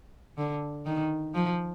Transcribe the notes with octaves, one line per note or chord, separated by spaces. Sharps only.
D3
D#3
F3